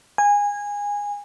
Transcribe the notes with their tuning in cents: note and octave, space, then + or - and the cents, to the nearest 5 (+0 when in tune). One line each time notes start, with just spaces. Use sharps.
G#5 -20